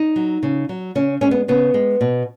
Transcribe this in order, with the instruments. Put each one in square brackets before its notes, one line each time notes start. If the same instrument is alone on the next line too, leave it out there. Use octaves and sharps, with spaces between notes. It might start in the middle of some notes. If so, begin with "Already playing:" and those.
Already playing: [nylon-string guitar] D#4
F#3
C#3
F#3
C#3 C#4
G#3 C#4
B3
C#3 B3
G#3
B2